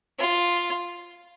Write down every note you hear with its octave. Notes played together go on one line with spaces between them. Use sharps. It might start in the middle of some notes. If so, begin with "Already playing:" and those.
F4